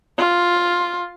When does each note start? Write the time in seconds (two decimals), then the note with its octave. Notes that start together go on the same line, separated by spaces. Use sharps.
0.18 F4